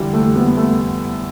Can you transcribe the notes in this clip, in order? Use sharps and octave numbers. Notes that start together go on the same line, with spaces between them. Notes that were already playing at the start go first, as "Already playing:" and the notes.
Already playing: D3 E3 G3
A3
B3
A3